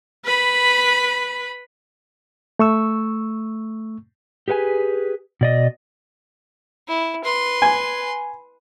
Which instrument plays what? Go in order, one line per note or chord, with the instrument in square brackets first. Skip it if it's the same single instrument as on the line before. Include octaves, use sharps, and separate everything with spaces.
[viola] B4 B5
[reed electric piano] A3 C#6 E6
[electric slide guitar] G4 G#4 B4 F#5 G#5
B2 D5 D#5
[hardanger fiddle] E4
B4 C6
[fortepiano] G#5